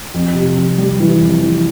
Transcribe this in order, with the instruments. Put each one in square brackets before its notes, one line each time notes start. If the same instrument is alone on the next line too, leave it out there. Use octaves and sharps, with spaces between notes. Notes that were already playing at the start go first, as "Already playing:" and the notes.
[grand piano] F2
C3
F2
G3
E3
F2
E3